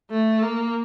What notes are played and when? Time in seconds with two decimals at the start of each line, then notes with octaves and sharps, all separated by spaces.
0.11 A3
0.43 A#3